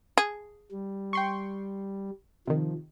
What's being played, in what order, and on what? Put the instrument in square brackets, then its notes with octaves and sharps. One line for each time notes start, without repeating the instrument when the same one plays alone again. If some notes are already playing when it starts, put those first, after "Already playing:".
[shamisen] G#4
[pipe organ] G3
[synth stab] G5 C6 C#6
[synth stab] C3 D#3 [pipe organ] F3